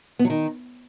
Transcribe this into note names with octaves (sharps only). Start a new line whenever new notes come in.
B3
F#3
D#3